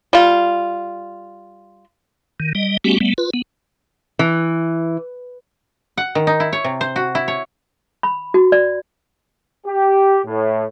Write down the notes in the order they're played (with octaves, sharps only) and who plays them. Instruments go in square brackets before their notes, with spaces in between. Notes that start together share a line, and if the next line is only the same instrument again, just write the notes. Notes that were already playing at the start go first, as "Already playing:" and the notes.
[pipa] G3 F4
[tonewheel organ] D#3
G3 D#5
G3 A3 B3 C#4 F#4 G4
G3 A3 B3
F4 B4
B3
[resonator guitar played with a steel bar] E3
[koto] F#5
D#3
D#4
E4
C#5
C3
C5
F#4
E4
C#5
[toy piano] B5
F#4
D5
[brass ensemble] G4
A2